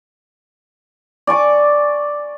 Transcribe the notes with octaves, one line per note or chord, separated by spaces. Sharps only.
D5 G#5 C#6 D6